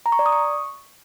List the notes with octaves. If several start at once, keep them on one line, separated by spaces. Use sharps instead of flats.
A#5
C#6
D5
D#6
C#6